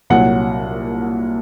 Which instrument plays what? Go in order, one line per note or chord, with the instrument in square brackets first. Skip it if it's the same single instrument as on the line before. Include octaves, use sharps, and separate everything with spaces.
[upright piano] C2 A#2 F#3 F#5